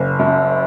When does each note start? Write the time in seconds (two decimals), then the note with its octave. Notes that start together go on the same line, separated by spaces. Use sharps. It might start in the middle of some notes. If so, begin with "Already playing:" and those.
Already playing: F#1
0.19 F#2